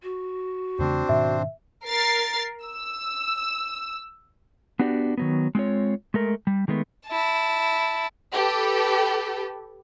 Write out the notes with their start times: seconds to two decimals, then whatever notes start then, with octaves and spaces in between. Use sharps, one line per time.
0.03 F#4
0.79 E2 C#3 A3 C4 D4 C5
1.09 G#2 B2 D#3 E5
1.87 A#4 A6 C7
2.65 E6
4.79 B3 D4 F#4 G4 D5
5.18 D#3 F#3 B3
5.55 G#3 C4 F4 C#5
6.14 G#3 A3 A#4
6.47 G3
6.68 D#3 G#3 A3 B3
7.07 E4 A5
8.34 G4 A4 B4